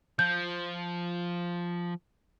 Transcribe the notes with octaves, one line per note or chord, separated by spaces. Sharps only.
F3 G6